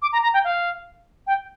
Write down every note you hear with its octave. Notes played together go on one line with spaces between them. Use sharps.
D6
A#5
A#5
G5
F5
G5